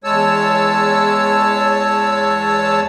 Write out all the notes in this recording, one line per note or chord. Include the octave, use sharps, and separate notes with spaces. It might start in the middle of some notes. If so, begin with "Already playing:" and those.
E2 G#3 C#5 A5 E6